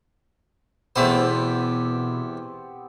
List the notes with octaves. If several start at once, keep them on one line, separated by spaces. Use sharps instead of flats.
E2 B2 A3 B3 C4 G4 C5